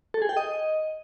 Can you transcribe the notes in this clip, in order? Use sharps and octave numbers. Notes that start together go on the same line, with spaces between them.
A4
G#4
G5
D#5